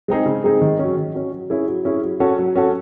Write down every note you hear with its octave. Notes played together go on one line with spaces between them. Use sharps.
G#3 C4 D#4 G#4
C#3
G#3 C4 D#4 G#4
D#3
F#3 C#4
D#3
F#3 C#4
F#3
C#4 E4 G#4
F#3
C#4 E4 G#4
F#3
C#4 F#4 A4
F#3
C#4 F#4 A4